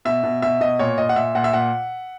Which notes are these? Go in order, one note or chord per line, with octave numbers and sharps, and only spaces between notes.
B2 E5
B2
B2 E5
B2 D#5
A#2 C#5
A#2 D#5
F#5
A#2 E5
A#2 F#5
E5
A#2 F#5